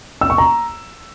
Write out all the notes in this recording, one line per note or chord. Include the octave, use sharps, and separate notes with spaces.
E6
C#6
A#5